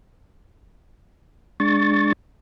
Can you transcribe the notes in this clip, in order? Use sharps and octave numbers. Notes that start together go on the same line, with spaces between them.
G#3 D4 C#6 A6